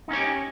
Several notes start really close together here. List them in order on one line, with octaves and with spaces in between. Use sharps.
D#4 C#4 C#5 G4